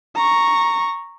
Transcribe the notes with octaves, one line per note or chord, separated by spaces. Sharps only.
A#5 C#6